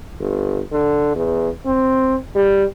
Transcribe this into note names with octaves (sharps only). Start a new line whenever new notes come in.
G1
D3
E2
C4
G3